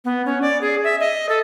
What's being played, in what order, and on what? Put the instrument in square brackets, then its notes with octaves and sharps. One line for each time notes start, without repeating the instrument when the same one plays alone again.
[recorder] B3
C#4
D5
G#4
E5
D#5
A4